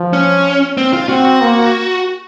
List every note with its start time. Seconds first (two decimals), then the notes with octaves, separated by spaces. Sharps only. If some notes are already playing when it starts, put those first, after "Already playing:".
Already playing: F3
0.13 C#4
0.77 C4
0.93 F4
1.09 C4 F#4
1.41 A#3